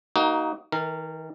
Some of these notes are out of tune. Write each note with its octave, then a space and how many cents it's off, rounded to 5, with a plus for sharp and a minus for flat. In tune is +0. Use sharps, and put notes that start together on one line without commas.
A#3 +0 D#4 +15 F#4 +30
D#3 +45 A#4 -20